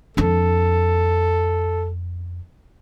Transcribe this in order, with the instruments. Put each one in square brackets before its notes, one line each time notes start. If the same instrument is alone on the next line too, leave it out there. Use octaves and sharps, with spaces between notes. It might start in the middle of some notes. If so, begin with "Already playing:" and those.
[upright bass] F2 D4 [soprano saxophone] A4